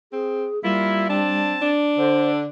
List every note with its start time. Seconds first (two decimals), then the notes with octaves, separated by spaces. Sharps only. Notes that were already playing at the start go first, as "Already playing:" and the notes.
0.12 C4 G#4
0.64 G3 A#3 E4 F4
1.09 C4 D4 A5
1.61 D4
1.98 D3 C5